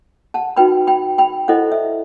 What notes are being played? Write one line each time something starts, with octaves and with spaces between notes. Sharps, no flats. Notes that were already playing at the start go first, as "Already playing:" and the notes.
F#5 A5
D#4 F#4 B4 G5 B5
G5 B5
G5 B5
E4 A4 C5 D#5 F#5
E5